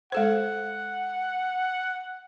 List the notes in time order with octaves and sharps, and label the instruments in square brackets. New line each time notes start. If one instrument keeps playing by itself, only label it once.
[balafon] G#3 A4 C5 [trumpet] F#5